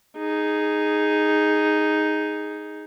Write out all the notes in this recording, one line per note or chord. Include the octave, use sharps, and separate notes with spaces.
D#4 G#4